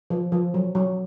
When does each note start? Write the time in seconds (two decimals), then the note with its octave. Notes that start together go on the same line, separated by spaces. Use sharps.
0.10 F3
0.32 F3
0.54 F#3
0.75 F#3